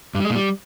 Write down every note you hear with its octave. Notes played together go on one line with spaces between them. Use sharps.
G2
G3
G#3
A#2
G3